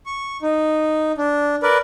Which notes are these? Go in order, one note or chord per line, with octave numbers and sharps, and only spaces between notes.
C#6
D#4
D4
A#4 B4 D5